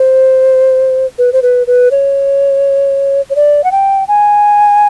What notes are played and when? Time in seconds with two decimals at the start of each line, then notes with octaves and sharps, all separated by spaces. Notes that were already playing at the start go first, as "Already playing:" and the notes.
Already playing: C5
1.18 B4
1.33 C5
1.42 B4
1.67 B4
1.91 C#5
3.30 C#5
3.35 D5
3.64 F#5
3.71 G5
4.08 G#5